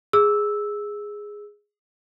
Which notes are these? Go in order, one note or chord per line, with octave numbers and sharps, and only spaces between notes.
G#4 E6